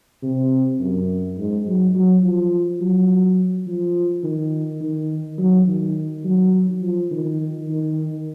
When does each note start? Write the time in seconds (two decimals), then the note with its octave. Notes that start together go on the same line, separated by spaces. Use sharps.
0.23 C3
0.80 F#2
1.38 G#2
1.67 F#3
1.95 F#3
2.23 F3
2.81 F#3
3.67 F3
4.24 D#3
4.81 D#3
5.39 F#3
5.68 D#3
6.25 F#3
6.82 F3
7.11 D#3
7.69 D#3